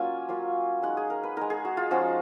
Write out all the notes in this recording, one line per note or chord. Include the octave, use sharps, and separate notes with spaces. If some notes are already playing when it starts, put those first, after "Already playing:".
Already playing: F#3 A#3 C#4 F4 G#5
F#3 A#3 C#4 F4
G#3 D#4 F#5
G#4
A#4
B4
G#3 D#4 A#4
G#4
F#4
F4
F3 G#3 C#4 F4 F#4